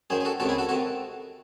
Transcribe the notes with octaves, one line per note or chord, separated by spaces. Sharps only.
F#2 D#3 G#4 C5
G#4
F#4 A4
C#2 C3 D#3 F#4 A4
E4 G#4
F#4 A4
C3 D#3 F#4 A4